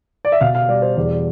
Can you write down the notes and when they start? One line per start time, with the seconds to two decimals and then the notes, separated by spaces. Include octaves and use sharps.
0.25 D5
0.32 E5
0.41 B2 F5
0.55 F5
0.69 G3 D5
0.82 C5
0.96 E2 D5